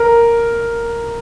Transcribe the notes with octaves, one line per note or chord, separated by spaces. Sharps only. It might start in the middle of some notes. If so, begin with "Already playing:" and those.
Already playing: A#4